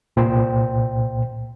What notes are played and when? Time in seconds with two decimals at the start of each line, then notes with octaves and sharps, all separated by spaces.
0.16 C2 A#2 C5 G5